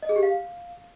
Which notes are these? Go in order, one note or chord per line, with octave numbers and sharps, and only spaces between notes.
D#5
G#4
G4
F5